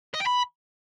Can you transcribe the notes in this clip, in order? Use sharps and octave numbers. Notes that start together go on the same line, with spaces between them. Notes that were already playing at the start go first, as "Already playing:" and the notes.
D#5
G5
B5